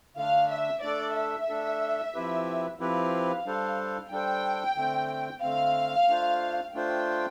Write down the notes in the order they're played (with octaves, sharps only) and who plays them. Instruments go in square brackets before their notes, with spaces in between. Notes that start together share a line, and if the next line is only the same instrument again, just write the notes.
[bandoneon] D3 A3 D4 [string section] F5
[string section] E5
[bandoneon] A3 D4 A4 [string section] D5
[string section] E5
[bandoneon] A3 D4 A4
F3 C4 E4 G4 B4
[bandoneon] F3 C4 E4 G4 B4 [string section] F5
[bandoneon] G3 D4 A4 C5
[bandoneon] G3 D4 A4 C5 [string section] G5
[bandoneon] D3 A3 C4
[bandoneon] D3 A3 C4 [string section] F5
[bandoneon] A3 D4 F4 C5
[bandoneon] A3 D4 F4 C5 [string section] G5